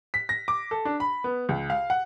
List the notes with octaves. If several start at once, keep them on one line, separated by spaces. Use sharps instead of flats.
B6
A#6
D6
A4
D4
B5
B3
C#2
F5
F#5